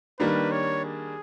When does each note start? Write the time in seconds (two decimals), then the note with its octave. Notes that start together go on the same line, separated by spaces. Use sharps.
0.19 D#3 G3 A#3 D4 B4
0.52 C#5
0.85 G#4